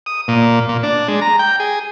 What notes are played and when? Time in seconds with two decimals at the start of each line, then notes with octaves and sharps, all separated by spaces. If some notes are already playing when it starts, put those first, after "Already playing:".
0.06 D#6
0.28 A#2
0.69 A#2
0.83 D4
1.08 G#3
1.21 A#5
1.39 G5
1.60 G#4